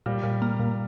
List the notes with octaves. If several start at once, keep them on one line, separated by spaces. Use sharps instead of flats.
A#2 G3
A#2
A#3
A#2